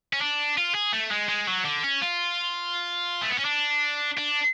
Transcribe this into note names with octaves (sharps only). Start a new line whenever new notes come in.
C#4
D4
F4
G#4
A3
G#3
G#3
F#3
D3
C#4
F4
A3
B3
C#4
D4
D4